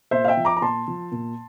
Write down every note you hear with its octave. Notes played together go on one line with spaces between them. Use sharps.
A#2 C5 E5
F5
E5 G5
F3
A#5 D6
A#5
A#2 A5 C6
F3
A#2